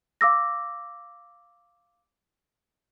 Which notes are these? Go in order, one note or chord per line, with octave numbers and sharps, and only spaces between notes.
F5 D6 E6 A#6